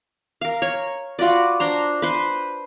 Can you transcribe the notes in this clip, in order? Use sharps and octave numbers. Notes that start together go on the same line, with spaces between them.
A#4 F5
C#5
F4 F#4 B4 D5
D4 C5 A#5
B4 C5